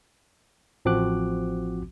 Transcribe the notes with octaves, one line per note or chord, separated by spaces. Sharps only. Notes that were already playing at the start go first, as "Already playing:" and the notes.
A1 F3 C4 F#4 D6 F#6